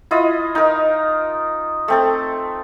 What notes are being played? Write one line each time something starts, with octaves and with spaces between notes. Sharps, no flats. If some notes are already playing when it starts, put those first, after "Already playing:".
E4 F4 D#5
D#4 A#4
A3 C4 A4